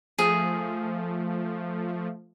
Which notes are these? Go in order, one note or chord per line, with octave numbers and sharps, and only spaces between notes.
F3 A3 G#4